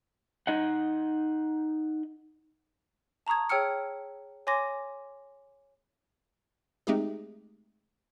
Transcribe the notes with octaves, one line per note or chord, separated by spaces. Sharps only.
D#4 D#5 F#5
A5 A#5 C#6 D#6 G#6
G#4 C#5 G5 E6 F6 C#7
C#5 G#5 C6 D6 A#6
G#3 A3 C4 D#4 G4 G#4